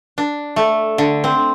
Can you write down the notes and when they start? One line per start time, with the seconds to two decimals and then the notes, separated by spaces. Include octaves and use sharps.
0.18 D4
0.56 A3
0.98 D3
1.24 C4